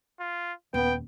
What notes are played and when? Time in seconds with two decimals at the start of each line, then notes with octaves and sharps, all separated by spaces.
0.20 F4
0.74 D#1 B3 G5